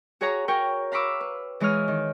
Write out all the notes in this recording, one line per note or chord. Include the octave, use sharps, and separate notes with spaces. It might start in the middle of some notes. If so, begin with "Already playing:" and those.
F#4 G#4 C#5 F#5 A#5
F#4 A#4 C#5 G5 A#5 C#6
F5 A#5 B5 C#6 D6 E6
B4
E3 G#3 E4 C#5 D#5 F6
D#3